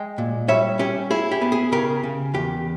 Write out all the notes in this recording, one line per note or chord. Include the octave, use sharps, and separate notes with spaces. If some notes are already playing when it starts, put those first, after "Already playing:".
Already playing: G#3 D#5 G5
A#2
G3 C#5 E5
C#4 G4
E4 G#4
G4
B3
G#4
C#3 G4 A#4
C#3
E2 G4